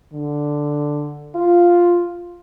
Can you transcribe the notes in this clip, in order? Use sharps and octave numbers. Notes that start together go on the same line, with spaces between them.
D3
F4